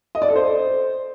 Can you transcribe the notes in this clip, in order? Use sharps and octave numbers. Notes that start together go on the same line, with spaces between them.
D#5
D5
A4
C5